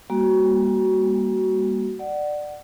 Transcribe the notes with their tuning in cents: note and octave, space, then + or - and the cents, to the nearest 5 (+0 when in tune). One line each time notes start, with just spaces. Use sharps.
G3 +40 A#3 +25 F#4 +15
D5 +15 F#5 +15